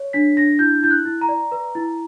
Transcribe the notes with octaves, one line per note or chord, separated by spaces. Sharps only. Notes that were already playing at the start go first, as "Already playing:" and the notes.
Already playing: C#5
D4 B6
D4 A#6
E4 G6
E4 G6
F#6
E4
A#5
D5
B4
E4